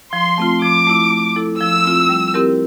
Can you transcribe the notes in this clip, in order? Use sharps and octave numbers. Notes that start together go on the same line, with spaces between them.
F3 C6
A3 C4 F4
F3 D6
A3 E4
A3
E4 A4
F3 E6
C4 F4
G3
C4 E4 G4 A#4